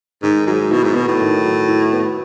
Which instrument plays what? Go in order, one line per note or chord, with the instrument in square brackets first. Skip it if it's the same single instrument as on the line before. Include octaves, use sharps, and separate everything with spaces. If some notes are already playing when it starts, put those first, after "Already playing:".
[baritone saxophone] G#2 [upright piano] D#3
[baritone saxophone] G#2 [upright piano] F#3
[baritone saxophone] B2 [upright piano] E4
[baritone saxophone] G#2
[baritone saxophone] B2 [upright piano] B3
[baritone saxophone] A2
[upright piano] D#3
F#3
E4
B3